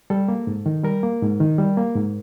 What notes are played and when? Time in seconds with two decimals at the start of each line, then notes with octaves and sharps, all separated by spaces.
0.10 G3 A4
0.28 A#3
0.47 G#2
0.66 D#3
0.84 G3 A#4
1.03 A#3
1.22 G#2
1.40 D#3
1.59 G3
1.77 A#3
1.95 G#2